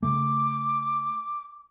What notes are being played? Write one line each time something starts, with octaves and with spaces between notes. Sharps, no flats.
C#3 A3 D6